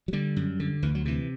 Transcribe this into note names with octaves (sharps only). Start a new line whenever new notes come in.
F#3
D3 G3
F#2
D3
D2 E3
F#3
C3 E3